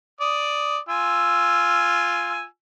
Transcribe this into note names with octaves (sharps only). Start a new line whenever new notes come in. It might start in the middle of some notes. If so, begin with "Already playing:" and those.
D5 D#6
F4 G#5 E6